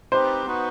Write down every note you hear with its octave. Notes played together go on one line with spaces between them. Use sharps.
C4 D#4 G4 B4 C5
B3 D#4 F#4 B4